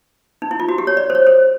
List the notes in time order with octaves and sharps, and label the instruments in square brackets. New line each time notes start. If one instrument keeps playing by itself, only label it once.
[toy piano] D#4
E4
F4
F#4
G4
C#5
D5
C5
C#5
C5